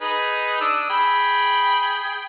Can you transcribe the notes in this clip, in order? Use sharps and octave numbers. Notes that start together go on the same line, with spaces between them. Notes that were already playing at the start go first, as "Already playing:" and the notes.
D#4 G#4 B4
D4 D#6 E6
G#4 G5 B5